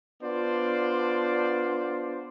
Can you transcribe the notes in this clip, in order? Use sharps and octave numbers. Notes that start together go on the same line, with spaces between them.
B3 D4 F4 C5 D5